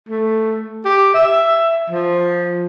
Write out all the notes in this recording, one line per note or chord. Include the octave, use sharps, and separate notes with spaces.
A3
G4
E5
F3